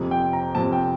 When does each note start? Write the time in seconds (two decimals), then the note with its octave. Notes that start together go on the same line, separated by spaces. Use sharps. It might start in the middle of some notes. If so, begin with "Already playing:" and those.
Already playing: F2 C3 F3
0.11 G5
0.33 A#5
0.55 F2 C3 F3 A5
0.72 G5